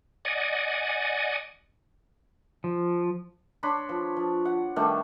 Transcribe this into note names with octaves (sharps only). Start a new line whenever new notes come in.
D5 D#5 F#5 G#5
F3
D4 C#5 B5 C6
F3
F3
F#5
D#3 G3 A3 D4